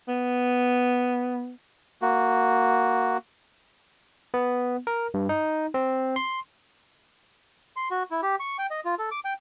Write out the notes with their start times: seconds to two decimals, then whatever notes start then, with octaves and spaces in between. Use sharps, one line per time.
0.08 B3
2.02 A#3 F#4
4.34 B3
4.87 A#4
5.14 G2
5.29 D#4
5.74 C4
6.16 C6
7.76 C6
7.91 F#4
8.11 E4
8.22 G4
8.40 C#6
8.58 G5
8.71 D#5
8.85 F4
8.99 A4
9.11 D6
9.25 G5